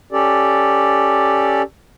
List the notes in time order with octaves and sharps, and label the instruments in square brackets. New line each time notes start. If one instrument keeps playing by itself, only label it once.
[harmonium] C#4 G4 A4 D5